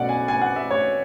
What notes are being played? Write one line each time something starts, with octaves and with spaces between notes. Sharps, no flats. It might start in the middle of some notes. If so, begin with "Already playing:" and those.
Already playing: B1 B2 A3 C#4 D5 F#5
G#5
G#5
F#5
E5
C#5